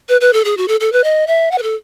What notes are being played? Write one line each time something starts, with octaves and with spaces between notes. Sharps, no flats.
B4
B4
A4
G#4
F#4
A4
A4
B4
D#5
E5
F#5
B4
A4